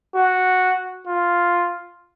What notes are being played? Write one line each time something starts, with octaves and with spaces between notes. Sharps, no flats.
F#4
F4